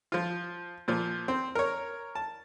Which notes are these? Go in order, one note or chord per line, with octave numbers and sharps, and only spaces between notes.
F3 F4
A#2 F3
C4
A#4 C#5
A5